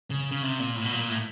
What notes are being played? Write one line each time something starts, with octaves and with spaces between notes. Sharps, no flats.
C#3
C#3
C3
A#2
A2
B2
A#2
A2